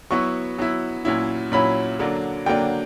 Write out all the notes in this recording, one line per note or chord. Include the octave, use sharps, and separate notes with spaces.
F#3 B3 E4 C#6
F#3 B3 E4
A#2 F#3 C#4 E4
A#2 F#3 C#4 E4 B5
D3 F#3 A#3 D4
D3 F#3 A#3 D4 G5